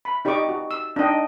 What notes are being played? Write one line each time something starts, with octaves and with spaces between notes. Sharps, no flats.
B5
D#4 G4 D5 D#5 C#6 D6
F#4
E6
D4 D#4 D#5 G5